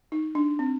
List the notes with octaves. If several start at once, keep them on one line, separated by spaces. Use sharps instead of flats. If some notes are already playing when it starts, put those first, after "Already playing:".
D#4
D4
C4